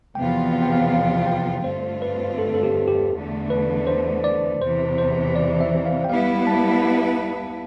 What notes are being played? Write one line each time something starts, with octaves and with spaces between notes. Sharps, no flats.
E2 C3 F3 B3 F4 G5
F5
G5
F5
F5
G5
G2 D3 A3 C4 F4 C5
B4
A4
A4
G4
G4
E2 D3 A3
B4
C5
D5
E2 C3 E3 C5
C5
D5
E5
F5
G5
G3 B3 E4 B4 F5
A5